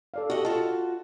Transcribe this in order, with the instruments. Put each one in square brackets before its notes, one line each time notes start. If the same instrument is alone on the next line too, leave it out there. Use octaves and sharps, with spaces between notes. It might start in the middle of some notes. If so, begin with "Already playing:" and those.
[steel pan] A4 D5 F5
[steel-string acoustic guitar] F#4 D#5 [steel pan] G4 A4 F#5
[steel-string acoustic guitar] F4 F#4 [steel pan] A4 A5